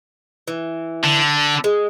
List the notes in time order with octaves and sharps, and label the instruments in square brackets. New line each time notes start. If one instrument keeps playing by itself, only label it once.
[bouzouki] E3
[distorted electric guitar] D3
[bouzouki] G#3